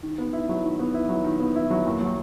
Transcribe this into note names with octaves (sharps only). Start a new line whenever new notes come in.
D#3
B3
E4
F#3
D#3
B3
E4
F#3
D#3
B3
E4
F#3
D#2
F#3